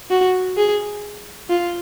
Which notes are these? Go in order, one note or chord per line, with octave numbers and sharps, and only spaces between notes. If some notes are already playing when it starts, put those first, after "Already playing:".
F#4
G#4
F4